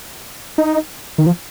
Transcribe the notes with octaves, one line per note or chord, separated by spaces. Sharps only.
D#4
D#3
F3